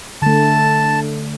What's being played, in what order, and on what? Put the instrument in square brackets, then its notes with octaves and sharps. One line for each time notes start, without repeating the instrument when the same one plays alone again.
[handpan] D3 A3 [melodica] A5